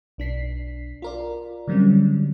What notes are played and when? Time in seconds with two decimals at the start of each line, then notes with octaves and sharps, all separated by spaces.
0.18 B1 D4 B6 C7
1.02 F4 A#4 D5
1.67 D3 F#3 G3 C4 C#4